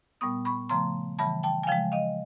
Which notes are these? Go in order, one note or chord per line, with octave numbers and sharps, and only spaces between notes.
A#2 G3 B3 C#6 D#6
B5 C#6
C#3 F3 A3 A#5 C6
C#3 E3 G3 A5 B5
G5 A5
G#5
C#3 F3 G#3 F5 G5
D#5 F5